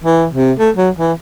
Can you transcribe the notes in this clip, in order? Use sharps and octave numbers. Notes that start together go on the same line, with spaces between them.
E3
C3
A3
F#3
E3